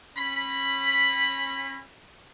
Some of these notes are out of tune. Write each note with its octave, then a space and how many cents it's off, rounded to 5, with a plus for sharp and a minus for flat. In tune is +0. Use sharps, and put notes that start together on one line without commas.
C#4 -35 B5 +0